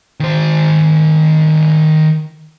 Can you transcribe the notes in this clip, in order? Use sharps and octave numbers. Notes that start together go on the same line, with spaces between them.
D#3 C5